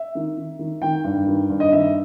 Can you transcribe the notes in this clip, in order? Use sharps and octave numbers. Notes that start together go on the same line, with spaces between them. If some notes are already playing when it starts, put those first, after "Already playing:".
Already playing: E5
D#3
D#3
D#3
D#3 G5
G2
D#3
G2
D#5
D#3 E5